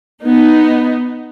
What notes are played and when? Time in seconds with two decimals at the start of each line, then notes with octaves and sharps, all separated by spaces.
0.22 B3 D#4